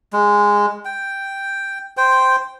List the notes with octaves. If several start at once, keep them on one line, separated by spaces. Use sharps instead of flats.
G#3
G5
C5 G5